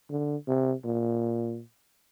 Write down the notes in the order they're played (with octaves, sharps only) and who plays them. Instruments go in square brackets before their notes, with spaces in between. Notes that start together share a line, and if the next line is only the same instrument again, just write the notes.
[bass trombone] D3
C3
A#2